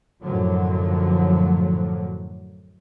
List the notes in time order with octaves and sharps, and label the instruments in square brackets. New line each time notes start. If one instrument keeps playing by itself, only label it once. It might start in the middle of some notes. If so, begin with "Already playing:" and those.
[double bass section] F#2 A2 D3 F3 F#3